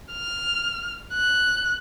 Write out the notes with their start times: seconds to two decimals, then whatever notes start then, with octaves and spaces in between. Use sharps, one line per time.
0.12 F6
1.13 F#6